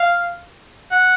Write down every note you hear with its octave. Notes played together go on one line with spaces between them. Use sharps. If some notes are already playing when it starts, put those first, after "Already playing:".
Already playing: F5
F#5